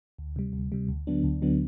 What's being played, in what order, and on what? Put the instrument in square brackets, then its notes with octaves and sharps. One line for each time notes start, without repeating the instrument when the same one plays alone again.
[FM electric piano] D2
C3 G3
D2
C3 G3
D2
D3 F#3 B3 D4
D2
D3 F#3 B3 D4